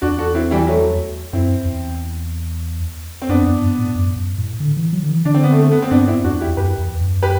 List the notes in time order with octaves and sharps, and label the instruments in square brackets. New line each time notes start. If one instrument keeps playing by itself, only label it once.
[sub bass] E2 [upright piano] D4 F#4
[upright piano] F#4 A4
C4 E4
E3 G3
F#3 A3
[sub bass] F#2 [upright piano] C4 E4
[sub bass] E2
[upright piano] C4
[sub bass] F#2 [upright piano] B3 D4
[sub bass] E2
F#2
G2
A2
F#2
F#2
A2
D3
E3
F#3
D3
E3
[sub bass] D3 [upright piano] D4
[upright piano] C4
B3
A3 C4
A3
B3
C4
[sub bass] G2 [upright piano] B3 D4
[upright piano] C4 E4
[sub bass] E2 [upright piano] D4 F#4
[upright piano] E4 G4
[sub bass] F#2 [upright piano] G4 B4
[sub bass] E2
F#2
[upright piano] G4 B4